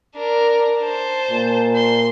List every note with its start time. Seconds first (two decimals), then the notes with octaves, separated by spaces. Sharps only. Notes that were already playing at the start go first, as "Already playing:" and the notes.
0.15 D4 A#4
0.81 C5 A5
1.30 A#2
1.75 C6